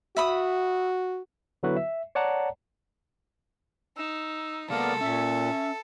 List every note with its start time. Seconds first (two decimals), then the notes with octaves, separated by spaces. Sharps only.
0.17 F#4 E5 B5 D#6
1.63 D3 F#3 B3 E4 F#4 B4
1.76 E5
2.15 C#5 D5 F#5 A5 A#5
3.96 D#4 E6
4.70 C3 G#3 A#3 B3 A4 A#4 D5 F5
5.01 A#2 C#4 E5